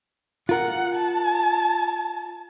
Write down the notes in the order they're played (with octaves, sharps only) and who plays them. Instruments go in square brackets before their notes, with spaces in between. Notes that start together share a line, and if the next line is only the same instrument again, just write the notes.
[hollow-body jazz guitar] F4 A#4 [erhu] F#5
[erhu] A5